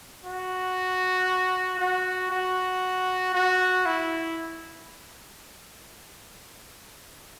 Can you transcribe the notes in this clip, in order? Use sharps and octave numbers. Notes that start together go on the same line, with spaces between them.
F#4
F#4
F#4
F#4
E4